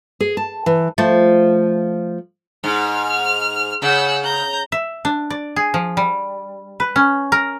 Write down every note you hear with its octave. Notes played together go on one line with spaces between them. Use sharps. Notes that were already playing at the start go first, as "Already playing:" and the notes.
G#4
A5
E3
F3 A3
G#2 F6
C#3 F#5 E6
A#5 G6
E5
D4
D5
G#4
F3
G3
B4
C#4
A#4